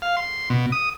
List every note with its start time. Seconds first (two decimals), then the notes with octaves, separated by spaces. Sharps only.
0.02 F5
0.17 C6
0.50 B2
0.72 D#6